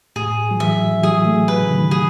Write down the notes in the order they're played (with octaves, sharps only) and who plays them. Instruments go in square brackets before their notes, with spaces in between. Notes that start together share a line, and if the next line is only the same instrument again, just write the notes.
[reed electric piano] A2 [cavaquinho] G#4
[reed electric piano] F#3
[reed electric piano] E3 [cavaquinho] E5
[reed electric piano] E3
[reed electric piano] F#3 [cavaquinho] G#4
[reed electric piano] A3
[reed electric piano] F#3 [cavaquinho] B4
[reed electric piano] C#3
D#3
[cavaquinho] G#4